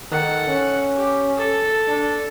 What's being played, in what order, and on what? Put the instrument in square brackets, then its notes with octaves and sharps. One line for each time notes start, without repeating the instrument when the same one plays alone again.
[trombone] D#3 [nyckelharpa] A4 F#5
[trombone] C#4
[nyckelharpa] G4
A4
[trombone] D4